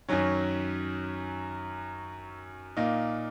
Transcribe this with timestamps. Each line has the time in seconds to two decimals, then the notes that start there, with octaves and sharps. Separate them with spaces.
0.09 F#2 D#3 F#3 C#4
2.77 A#2 A#3 D#4